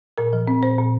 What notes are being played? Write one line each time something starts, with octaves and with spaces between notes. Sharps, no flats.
A#2 A#4
F3
C4
A#2 C5
A#2